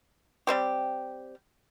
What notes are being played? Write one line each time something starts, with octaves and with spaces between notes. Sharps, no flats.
G3 C4 G4